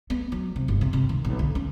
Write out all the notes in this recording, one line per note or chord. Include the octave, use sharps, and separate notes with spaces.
B3
F#3
C3
G1
C3
C3
D#3
B1
D3
C#4